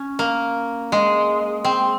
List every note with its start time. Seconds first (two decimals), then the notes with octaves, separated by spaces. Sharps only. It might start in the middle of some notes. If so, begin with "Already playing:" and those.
Already playing: C#4
0.19 A#3
0.92 G#3
1.65 C4